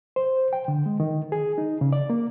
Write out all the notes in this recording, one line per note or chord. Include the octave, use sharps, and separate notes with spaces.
C5
G5
D3
G#3
D#3
G#4
D#4
C#3
D5
A#3